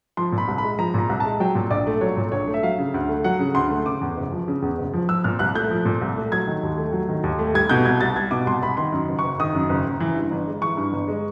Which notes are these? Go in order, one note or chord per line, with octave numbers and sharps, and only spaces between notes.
F3 C6
A#2
B5
C2
B5
G#3
F3 A#5
A#2 A#5
C2
G#3 A5
F#3 G5
A#2
A#1 D5
A3
F#3 C#5
A#2
A#1 C#5
A3
E5
F#3 F5
C#3
D2
A3
F#3 F#5
C#3
D2 C6
A3
C#3 D6
E2
F#1
F3
C#3
E2
F#1
F3
F3 E6
A#2 F6
C2 F#6
A3 G6
F3
A#2
C2
A3
F#3 G#6
D#3
D#2
A3
F#3
D#3
D#2
A3
G3 G#6
B2 G6
C2 G#6
C2 A6
G3 G#6
B2 D6
C2 C6
C2 B5
D#3 C6
F#2
F#1
C#6
F#1
D#3 D#6
F#2
F#1
F#1
E3
G2
G1
G#3
E3 C#6
G2
G1
G#3